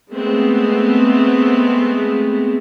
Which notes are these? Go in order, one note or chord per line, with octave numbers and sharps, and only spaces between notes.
G#3 A3 B3 C4